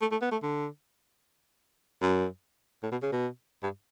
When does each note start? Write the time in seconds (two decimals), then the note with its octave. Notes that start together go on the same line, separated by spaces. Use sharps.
0.01 A3
0.12 A3
0.22 B3
0.32 A3
0.43 D3
2.02 F#2
2.83 A2
2.92 B2
3.02 C#3
3.12 B2
3.63 G2